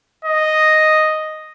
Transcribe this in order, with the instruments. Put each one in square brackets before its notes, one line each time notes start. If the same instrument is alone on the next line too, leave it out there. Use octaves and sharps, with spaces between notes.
[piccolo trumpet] D#5